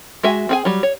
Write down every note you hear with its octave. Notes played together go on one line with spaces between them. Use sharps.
G#3 F#4 E5 G#5
C4 G#4 G#5
F#3 G3
C#5